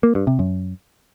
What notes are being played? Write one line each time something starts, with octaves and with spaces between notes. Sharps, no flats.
A#3
G2
C3
F#2